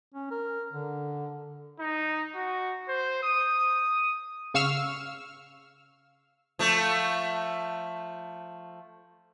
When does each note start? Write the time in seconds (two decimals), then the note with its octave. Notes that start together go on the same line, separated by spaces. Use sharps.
0.14 C#4
0.31 A#4
0.73 D3
1.79 D#4
2.35 F#4
2.88 C5
3.23 D#6
4.54 C#3 F5 C#6 E6 F6
6.59 F3 A3